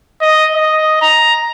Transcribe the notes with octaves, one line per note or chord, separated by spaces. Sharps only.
D#5
D#5
A#5